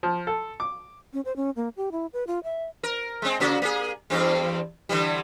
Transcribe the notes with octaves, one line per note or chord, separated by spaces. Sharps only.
F3
A4
D6
C#4
C5
C#4
A#3
G4
E4
B4
F4
E5
A#4
G#3 C4
C#3 A#3 F#4
A#3 G#4
E2 G2 C4
D3 E3 G3